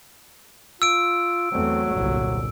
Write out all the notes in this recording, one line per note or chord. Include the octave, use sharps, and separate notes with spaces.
F4 E6 D7
E2 F#3 A3 C4
G1 C2 A#2